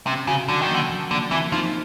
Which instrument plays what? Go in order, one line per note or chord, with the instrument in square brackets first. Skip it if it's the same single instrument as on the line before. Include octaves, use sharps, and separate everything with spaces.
[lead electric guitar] C3 [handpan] C#4
[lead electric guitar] C#3 [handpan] F#4
[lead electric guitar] D3 [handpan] F#3
[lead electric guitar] D#3
[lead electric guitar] D3 [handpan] A#3
[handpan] F3
[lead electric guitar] D3 [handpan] A#3
[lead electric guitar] E3 [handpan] C4
[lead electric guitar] F3 [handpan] D#4